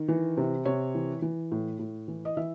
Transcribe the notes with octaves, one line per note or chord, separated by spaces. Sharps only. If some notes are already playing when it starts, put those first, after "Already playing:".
Already playing: D#3
E3
C3
C3 C#5
E3
E3
A2
A2
E3
D#5
E3 E5